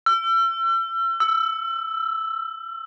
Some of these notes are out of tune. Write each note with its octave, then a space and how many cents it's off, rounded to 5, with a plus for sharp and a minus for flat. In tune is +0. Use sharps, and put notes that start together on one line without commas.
E6 +40
E6 -5